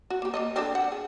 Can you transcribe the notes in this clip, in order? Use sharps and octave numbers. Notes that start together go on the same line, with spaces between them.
F#4
A#3 G4
A#3 B3 D#5
C4 D4 A4
F#5
G#4